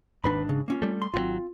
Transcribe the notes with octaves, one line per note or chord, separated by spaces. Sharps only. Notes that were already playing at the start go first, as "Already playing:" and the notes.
G#1 D#2 G#2 D4 B4 B5
C#3
A#3 C#4 F4
G3 A3
C6
G#1 B2 F#3 C4 F4